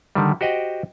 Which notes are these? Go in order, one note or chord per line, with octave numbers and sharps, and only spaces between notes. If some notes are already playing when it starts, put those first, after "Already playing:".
D3 D#3 G3
F#4 G4 C5 D#5 F#5 G5